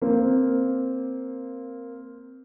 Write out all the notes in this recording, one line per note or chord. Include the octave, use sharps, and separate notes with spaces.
A#3 C4